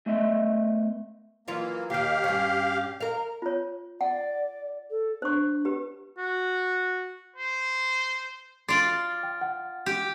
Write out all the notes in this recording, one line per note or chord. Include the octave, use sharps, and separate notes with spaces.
A3 B3 D#5 E5
E3 F#3 A#3 F4
D#2 D#3 G4 F5
G2 C#4
A#4 F5
F4 C#5
D5 F#5
A4
D4 C5 C#6
G4 B4
F#4
C5
F4 D5 C6 C7
G5
F#5
G4